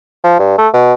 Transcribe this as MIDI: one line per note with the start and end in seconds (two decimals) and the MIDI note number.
0.24 0.37 53
0.39 0.54 43
0.58 0.68 57
0.74 0.93 47